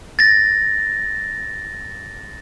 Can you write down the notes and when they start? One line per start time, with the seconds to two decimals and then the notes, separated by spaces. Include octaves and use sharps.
0.19 A6 A#6